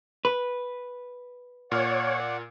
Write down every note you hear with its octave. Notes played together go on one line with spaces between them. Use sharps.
B4
A#2 C#5 D5 F#5 F6